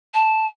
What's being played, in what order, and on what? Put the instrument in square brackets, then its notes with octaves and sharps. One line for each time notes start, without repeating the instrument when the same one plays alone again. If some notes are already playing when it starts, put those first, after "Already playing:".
[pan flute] A5